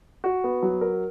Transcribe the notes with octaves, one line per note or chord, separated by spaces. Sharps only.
F#4
B3
F#3
A#4